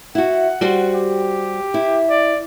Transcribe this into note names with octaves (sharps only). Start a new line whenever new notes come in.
E4 F#4 F#5
G3 F#4 C5
G4
E4
D5